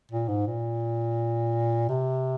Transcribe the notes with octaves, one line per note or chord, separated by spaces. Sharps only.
A#2
G#2
A#2
C3